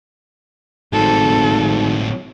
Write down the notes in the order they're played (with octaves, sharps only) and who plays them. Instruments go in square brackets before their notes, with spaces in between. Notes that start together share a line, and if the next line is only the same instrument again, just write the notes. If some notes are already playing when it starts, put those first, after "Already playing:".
[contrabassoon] G#1 [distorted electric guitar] A2 C4 [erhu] A4